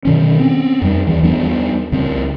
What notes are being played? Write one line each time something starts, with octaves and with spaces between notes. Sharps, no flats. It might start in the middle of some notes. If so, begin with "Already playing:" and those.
B2 D#3 C#4
C4 C#4
F2 G3
D#2 E3
E2 G3 B3 D4
C#2 C#3 C4